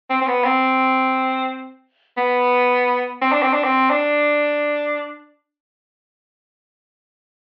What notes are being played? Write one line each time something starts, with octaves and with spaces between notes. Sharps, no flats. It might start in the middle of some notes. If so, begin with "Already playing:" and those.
C4
C4
B3
C4
B3
C4
D4
C4
D4
C4
D4